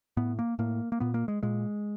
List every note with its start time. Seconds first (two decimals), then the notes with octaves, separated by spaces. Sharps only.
0.17 A2 B3
0.39 A#3
0.59 A2 A#3
0.92 A#3
1.00 A#2 B3
1.14 A#3
1.28 G#3
1.43 A#2 G#3